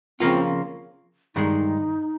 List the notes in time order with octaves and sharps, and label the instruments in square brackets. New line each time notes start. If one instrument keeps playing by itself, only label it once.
[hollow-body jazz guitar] C#3 F3 A#3 F4 [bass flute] C4
[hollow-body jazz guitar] G2 D#3 G#3 [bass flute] D#4